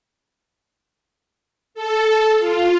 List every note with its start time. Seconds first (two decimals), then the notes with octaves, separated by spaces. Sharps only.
1.74 A4
2.38 F4